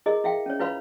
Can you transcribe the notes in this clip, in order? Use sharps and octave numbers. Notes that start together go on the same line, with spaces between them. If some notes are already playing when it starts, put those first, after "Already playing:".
E4 G#4 A#4 D#5
E4 E5 F5 G5
C#4 C#5
E4 F4 B4 C#5 F5 B5